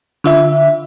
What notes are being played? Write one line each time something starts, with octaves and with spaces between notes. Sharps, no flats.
D3 F4 E5